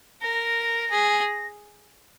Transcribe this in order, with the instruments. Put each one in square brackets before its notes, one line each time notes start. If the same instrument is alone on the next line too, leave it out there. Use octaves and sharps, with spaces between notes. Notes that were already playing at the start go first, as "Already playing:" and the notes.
[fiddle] A#4 [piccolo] A#6
[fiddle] G#4